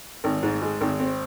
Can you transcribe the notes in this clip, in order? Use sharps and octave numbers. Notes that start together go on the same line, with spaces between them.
G#1
G#2
G#3
G#1
C4